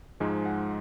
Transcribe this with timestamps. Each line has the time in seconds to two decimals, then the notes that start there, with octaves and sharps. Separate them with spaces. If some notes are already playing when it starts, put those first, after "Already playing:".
0.20 G#2 F3 G#3 D#4 G#5
0.46 F#5